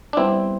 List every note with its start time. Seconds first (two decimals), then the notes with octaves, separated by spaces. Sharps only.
0.13 D4
0.17 G3 B3 C4 E4